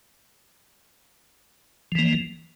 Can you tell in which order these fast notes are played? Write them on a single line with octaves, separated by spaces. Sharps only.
F3 E3 A#3